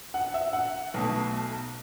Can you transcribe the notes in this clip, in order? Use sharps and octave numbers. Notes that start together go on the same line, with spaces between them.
F#5
E5
F#5
B1 B2 A3